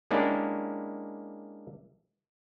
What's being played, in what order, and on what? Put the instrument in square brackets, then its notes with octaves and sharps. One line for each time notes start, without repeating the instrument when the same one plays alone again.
[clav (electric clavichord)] G#3 A#3 C#4 D4 E4 G4